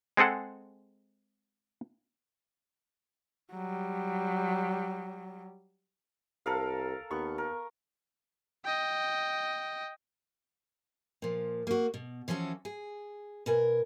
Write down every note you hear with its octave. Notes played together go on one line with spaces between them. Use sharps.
G#3 C4 G#4 A4 F#5
F#3 G3
C2 A4 A#4 F5
D#2 B3 C#6
A#4
D#5 G5
A#2 F3
A#3 F#4
B2
E3 F3 C#4 F#4 A4
G#4
B2 A#4 G#5